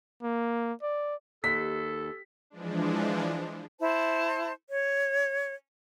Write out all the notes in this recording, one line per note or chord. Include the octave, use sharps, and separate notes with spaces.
A#3
D5
D#2 A4 B6
E3 F3 G#3 D4
E4 C5 A5
C#5